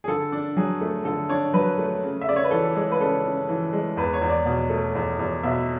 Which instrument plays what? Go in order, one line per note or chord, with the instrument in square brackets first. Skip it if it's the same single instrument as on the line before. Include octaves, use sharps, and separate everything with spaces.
[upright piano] G#4
D3 A4
D4
F#3 G#4
A3
D3 A4
D4 C#5
F#3 B4
A3
C#3
E5
C#3 D5
C#5
B4
E3 A4
G#3
B4
C#3 A4
C#3
E3
G#3
E2 B4
C#5
E2
D5
B2
A3
E2
E2
B2 E5